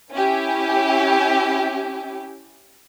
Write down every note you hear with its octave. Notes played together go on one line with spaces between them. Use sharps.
C#4 E4 G4